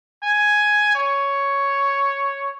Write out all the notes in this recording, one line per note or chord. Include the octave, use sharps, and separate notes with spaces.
G#5
C#5